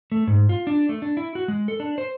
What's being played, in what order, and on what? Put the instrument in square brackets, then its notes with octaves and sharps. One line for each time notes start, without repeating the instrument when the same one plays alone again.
[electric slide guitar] A3
G#2
F4
D4
A3
D4
E4
F#4
G#3
A4
D4
C5